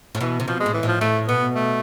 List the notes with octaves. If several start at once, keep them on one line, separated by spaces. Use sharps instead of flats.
A2
B2 E3
C3
B2 F3
G#3
A2
E3
A2 F3
A2 A3
B2 B3
A3